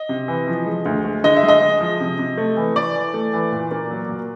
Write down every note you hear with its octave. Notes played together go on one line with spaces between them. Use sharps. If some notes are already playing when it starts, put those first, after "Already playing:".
Already playing: D#5
C3
E3
F3
G#3
D2
G#3
D3 D#5
E5
G#3
D#5
G#3
F3
C3
C3
A3
E3
E3 D5
E3
A3
E3
A#2
A#3
F#3
A#2